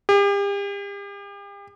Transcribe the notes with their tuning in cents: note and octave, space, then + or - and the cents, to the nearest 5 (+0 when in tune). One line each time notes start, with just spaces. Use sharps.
G4 +40